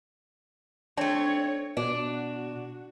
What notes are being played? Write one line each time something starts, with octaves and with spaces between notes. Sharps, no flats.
A3 C4 D4 C#5
B2 D4 F#4